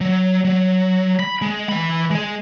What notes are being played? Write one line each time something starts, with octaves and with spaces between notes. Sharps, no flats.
F#3
F#3
B5
G#3
E3 B5
G#3 G#4